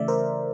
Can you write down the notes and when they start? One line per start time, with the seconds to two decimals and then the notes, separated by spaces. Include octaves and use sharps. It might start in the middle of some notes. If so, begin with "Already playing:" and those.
Already playing: C#3 E3 A3 D5 E5
0.08 A#4 C5